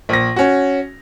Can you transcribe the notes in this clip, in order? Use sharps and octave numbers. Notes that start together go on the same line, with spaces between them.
A#1 A#6
C#4 F#4